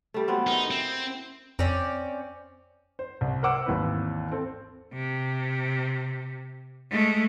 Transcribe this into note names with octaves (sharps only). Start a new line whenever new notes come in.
G3 A3
F#3 B3 C4
D#4 E4 A#4
C4
F2 C4 C#4 D5
C5
C2
A#4 C5 F#5 D6 E6
G#1 D#2 E3 B4
C4 A4
C3
G#3 A3